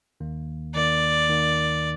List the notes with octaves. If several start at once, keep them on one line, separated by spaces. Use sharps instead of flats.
D#2 D#3 A#3
D#2 D#3 A#3 D5
D#2 D#3 A#3